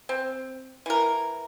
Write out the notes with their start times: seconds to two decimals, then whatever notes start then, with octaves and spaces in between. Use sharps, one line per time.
0.09 C4
0.86 E3 A#4